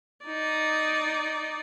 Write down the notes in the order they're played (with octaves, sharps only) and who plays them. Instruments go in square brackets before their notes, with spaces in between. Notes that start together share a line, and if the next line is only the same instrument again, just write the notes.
[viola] D#4 D5